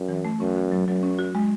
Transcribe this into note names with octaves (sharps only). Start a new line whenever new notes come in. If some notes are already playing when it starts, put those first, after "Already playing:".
Already playing: F#2
E3
A3
F#2 C#4
F#4
F#3
F#2 F#3
C#4
F#4
G#3